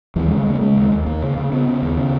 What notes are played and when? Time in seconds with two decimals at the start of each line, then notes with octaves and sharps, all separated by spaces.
0.16 D#2 E3
0.27 G#3
0.31 C#3
0.43 G#3
0.46 C#3 A#3
0.61 C#3 G#3
0.76 D#2
0.91 D#2
1.06 D#2 A#3
1.22 C#3
1.37 C#3
1.52 C#3 B3
1.67 C#3
1.82 D#2
1.97 C#3